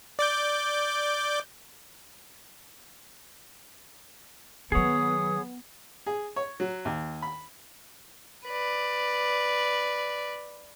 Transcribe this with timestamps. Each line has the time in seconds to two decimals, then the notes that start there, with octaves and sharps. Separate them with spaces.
0.19 D5 D6 G6
4.72 D#3 F#3 B3 G#4 C#5 D#6
6.06 G#4
6.36 C#5
6.60 F#3
6.85 D#2
7.22 B5
8.46 B4 D5